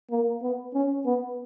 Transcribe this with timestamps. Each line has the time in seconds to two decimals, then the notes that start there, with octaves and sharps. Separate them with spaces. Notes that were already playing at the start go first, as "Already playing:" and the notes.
0.10 A#3
0.42 B3
0.74 C#4
1.05 B3